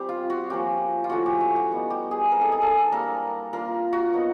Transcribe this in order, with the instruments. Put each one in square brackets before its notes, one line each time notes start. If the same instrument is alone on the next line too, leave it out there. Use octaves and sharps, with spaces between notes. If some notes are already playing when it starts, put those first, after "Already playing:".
Already playing: [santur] G3 C4 G4
F4
F#4
F3 A#3 C#4 G4
F4
F3 A3 C#4 E4 F#4
G4
F#4
F#4
G3 B3 D#4
G4
G#4
G#3 C4 E4 A#4
A4
G#4
A4
G3 A#3 D4 A#4
A#3 D4 F4 A#4
F#4
F#3 B3 D#4